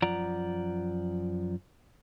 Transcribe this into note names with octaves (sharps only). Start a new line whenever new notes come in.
F#2 F3 F4 D5 F#5 A#5